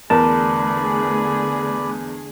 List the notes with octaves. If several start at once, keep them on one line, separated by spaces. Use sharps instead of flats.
E2 D3 A3 G#4 A#4 B4 D5 A5